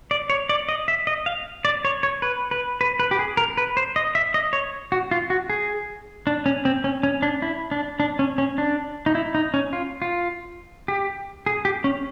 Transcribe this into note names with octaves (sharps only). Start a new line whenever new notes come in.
D5
C#5
D5
D#5
E5
D#5
F5
D5
C#5
C#5
B4
B4
B4
B4
G4
G#4
A#4
B4
C5
D#5
E5
D#5
C#5
F#4
F4
F#4
G#4
D4
C#4
C4
C#4
C#4
D4
E4
D4
D4
C#4
C#4
D4
D#4
E4
D#4
C#4
F4
F4
G4
G#4
G4
C#4